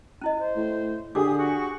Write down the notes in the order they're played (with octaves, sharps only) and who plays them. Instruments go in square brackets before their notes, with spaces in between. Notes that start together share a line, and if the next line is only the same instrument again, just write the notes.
[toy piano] C#4 E4 D#5
[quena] C5
[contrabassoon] A2
[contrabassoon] D3 [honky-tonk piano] G4 G#4 [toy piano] D6 [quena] D#6
[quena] F#4